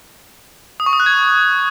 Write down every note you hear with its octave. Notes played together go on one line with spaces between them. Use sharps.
D#6
C#6
D#6
F#6
G#6